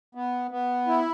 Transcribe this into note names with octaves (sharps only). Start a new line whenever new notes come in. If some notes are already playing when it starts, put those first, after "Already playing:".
B3
B3
E4